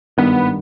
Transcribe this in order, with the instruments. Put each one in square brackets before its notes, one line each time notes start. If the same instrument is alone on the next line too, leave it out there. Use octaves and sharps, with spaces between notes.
[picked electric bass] G#1 G2 D#3 [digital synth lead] B3